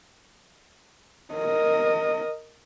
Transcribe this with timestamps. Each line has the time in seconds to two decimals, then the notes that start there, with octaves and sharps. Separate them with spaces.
1.34 A#4 D#5